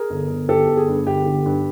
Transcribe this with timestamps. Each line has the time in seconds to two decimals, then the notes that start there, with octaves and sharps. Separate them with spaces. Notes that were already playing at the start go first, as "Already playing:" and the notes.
Already playing: G#4 A#4
0.10 G1
0.30 G1
0.48 G1 G4 A4
0.68 G1
0.77 G#4
0.88 G2
1.07 G1 G4
1.26 D3
1.46 G2